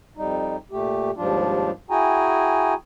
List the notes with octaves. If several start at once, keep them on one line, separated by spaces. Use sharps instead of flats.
F2 G3 D#4
A#2 A3 G4
D#2 G#2 F3 G3 D4 F4
E4 F#4 G#4 G5 G#5 A#5